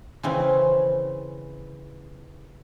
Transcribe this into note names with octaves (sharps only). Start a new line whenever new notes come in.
C#3 E3 C4